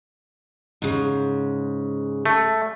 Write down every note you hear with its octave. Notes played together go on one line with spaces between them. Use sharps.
G#2 C#3
A3